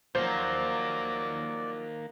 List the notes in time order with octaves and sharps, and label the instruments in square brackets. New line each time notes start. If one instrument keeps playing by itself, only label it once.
[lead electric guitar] D#3 A#3 [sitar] F3 F#3 [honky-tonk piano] C5 [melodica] D5